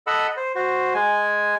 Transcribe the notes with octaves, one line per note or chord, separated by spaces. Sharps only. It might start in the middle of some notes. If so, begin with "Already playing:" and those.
A4 D#5 F#5 B5 E6
C5
F#4 C5
G#3 G#5